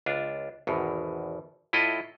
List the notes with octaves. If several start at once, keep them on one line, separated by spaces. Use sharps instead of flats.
C#2 D4 F4
G#1 E2 B2
A2 E4 F4 A4 D#5